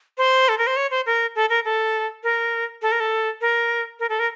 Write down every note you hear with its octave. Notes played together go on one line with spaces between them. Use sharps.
C5
A4
A#4
C5
C#5
C5
A#4
A4
A#4
A4
A#4
A4
A#4
A4
A#4
A#4
A4
A#4